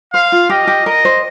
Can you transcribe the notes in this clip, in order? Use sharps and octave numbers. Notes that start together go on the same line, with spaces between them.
C5 F5
F4
G4 D#5
G4
A#4 D#5
C5